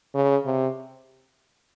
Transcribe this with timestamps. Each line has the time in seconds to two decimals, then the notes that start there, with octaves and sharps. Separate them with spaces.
0.15 C#3
0.46 C3